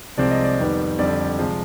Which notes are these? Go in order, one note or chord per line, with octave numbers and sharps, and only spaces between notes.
C2 C3 F3 G#3 C4 D5
D#5
D5
F2 D#3 G3 B3
F2 D3 G3 C4 D5
C3 F3 G#3